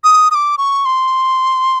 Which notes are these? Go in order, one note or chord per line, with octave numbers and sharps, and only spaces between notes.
D#6
D#6
D6
C#6
C6